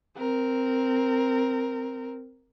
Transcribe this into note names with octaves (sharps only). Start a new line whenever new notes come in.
C4 A#4